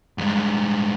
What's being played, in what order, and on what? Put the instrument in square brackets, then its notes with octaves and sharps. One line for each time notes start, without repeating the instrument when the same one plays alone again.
[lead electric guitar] G2 G#3